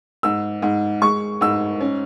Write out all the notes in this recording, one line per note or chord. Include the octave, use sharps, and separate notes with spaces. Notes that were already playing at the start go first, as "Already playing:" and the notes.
G#2 E6
G#2
G#3 C#6
G#2 E6
C#4